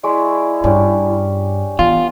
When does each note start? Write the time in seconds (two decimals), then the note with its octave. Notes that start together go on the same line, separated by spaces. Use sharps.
0.03 G#3 E4 D5 C#6
0.64 G2 C#4 D4 G4
1.79 E3 B3 F4